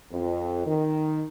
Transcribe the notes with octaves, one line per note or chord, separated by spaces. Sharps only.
F2
D#3